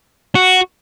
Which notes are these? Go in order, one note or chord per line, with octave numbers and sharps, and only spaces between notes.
F#4